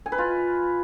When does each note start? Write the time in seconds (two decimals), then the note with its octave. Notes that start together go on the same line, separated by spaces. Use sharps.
0.06 G#5
0.12 B4
0.18 F4